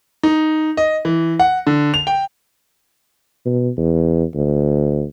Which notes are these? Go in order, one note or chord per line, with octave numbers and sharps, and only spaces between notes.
D#4
D#5
E3
F#5
D3
F7
G5
B2
E2
D2